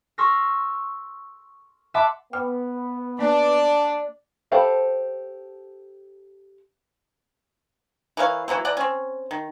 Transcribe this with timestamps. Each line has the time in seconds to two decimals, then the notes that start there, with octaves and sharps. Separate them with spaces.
0.18 C6 C#6 E6 F6 A#6
1.94 E5 F#5 A5 B5 C6 D6
2.33 B3 G5 D6 F6
3.19 A#3 D4 D5
4.52 G4 A4 C5 F5 B5
8.17 E3 A#4 C#5 F5
8.48 E3 F#3 A#3 C4
8.65 E3 D5 F#5 A#5
8.77 C4 C#4
9.31 D#3